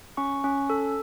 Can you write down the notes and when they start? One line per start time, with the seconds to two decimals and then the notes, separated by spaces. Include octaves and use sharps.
0.17 C#4 C#6
0.44 C#4
0.70 A4